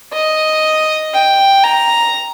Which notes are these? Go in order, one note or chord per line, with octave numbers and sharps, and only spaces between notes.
D#5
G5
A#5